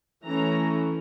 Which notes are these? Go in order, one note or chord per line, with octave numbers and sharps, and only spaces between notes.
E3 A3 C#4 A#5